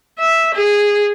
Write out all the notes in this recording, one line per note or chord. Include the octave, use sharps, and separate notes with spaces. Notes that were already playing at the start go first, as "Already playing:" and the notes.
E5
G#4